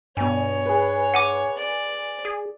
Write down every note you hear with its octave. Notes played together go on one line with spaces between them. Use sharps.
G2 B2 C#5 G#5
G#4 B4
F#5 G#5 D6
D5
G#4